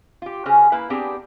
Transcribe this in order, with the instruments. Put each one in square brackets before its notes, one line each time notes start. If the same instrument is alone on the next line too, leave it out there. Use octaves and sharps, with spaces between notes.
[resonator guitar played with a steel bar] F4 G4
C#3 C#4 F#4 G#4 C5
A#3 E4 B4 F5
B3 C4 D4 G4 G#4